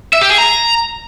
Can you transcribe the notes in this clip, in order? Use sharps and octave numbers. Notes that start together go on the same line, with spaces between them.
E5
G4
G#4
A#5